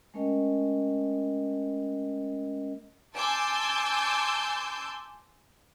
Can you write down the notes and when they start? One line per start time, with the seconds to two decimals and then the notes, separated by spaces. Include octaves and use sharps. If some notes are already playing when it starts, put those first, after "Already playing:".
0.14 G#3 A3 C#4 A#4 D#5 G5
3.16 G#5 A5 C6 D6 E6 G6